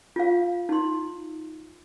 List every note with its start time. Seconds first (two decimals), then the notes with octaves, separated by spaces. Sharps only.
0.16 F4 F5
0.69 D#4 C6